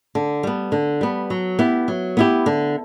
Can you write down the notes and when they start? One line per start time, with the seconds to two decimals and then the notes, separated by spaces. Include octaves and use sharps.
0.15 D3
0.43 G3 B3
0.72 D3
1.01 G3 B3
1.30 F#3
1.59 B3 E4 G4
1.88 F#3
2.17 B3 E4 G4
2.46 D3